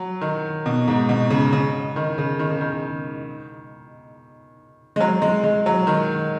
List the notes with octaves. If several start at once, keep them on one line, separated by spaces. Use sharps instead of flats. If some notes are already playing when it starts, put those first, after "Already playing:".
Already playing: F#3
D#3
B2
G#2
B2
C#3
C#3
D#3
C#3
D#3
C#3
D#3
G#3
F#3
G#3
G#3
F#3
D#3